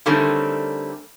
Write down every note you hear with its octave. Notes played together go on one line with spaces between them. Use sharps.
D3 D#3 G3 A3 C4 C#4